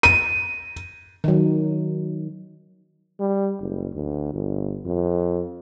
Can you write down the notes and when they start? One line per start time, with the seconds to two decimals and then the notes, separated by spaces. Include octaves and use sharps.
0.03 D#7
1.24 D#3 F#3
3.20 G3
3.60 F#1
3.94 D2
4.34 G1
4.86 F2